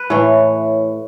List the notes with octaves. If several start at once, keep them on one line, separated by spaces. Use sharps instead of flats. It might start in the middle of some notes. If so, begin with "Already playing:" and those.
Already playing: B4
A2 E3 C#5